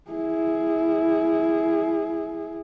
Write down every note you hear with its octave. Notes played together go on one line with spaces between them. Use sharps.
E4 G#4